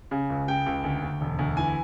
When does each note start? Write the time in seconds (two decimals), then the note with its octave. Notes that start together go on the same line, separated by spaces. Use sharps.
0.11 C#3
0.30 C#2
0.48 C#3 G5
0.66 C#2
0.84 D2
1.02 D2
1.21 E1
1.39 D2
1.57 E3 G#5